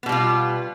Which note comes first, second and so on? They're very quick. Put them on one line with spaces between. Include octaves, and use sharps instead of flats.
B3 B2 G3 F4